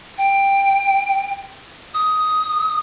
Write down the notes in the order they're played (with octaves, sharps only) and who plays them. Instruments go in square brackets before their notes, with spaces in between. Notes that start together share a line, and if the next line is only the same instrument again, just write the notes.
[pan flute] G5
D#6